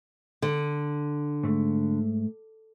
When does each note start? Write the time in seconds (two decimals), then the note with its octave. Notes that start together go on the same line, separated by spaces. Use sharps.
0.42 D3
1.43 G#2 A3